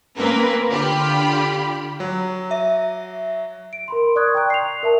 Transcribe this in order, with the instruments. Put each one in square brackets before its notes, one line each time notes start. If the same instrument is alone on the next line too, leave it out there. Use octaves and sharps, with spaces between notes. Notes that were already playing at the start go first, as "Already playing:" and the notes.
[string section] A#3 C4 C#4 A#4 B4
D3 F4 G4 B5
[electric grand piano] F#3
[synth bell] E5
[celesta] D7
A#4 B5 C6
D5 C#6 D#6 F#6 G#6
G5 A#5 C6 C#6 F#6 G6
C7 F7
A#4 E5 A5